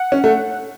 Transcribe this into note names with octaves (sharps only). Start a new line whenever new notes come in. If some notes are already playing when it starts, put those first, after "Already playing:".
Already playing: F#5
C#4
A3